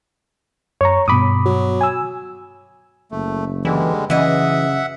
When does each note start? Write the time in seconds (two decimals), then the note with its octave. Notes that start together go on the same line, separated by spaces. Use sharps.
0.81 F#2 C#5 A#5 C#6
1.08 G2 B2 B5 D6 D#6
1.45 F#3
1.81 G#5 E6
3.11 F#1 A3
3.65 D3 E3 G3 G#3
4.10 F#2 C#3 E3 D#5 E5 F#5